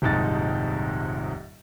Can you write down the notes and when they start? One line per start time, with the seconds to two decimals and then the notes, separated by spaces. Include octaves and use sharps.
0.02 D#1 C2 F2 G#2 D#4 A6